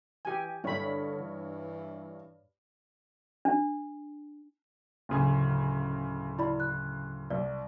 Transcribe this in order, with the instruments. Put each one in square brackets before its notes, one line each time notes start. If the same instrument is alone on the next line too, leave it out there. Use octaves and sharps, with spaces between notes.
[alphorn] E3 [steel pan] G4 G#5
[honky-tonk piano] G2 C#5 [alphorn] D3 [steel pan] E4 B5
[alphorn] E3
[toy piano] D4
[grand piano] D1 C#3 G#5
[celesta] E4 D5 B5
F#6
[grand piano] C2 [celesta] D5